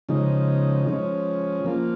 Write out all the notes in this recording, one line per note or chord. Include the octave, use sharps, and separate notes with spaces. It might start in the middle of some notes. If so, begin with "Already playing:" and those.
C#3 F3 G#3 D#4
F3 G#3 C#4
F3 A#3 F4